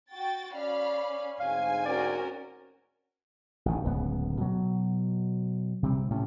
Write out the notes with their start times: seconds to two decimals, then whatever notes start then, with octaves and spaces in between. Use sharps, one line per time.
0.12 F#4 G5 A6
0.55 C#4 D5 F5 B5
1.40 D2 G#2 C4 F5 G#5
1.85 C#4 F#4 A#4 D5
3.66 A1 D#3
3.84 D1 C#2 B3
4.41 B2 F#3
5.83 C3 G3 C4
6.11 A2 C3 C#4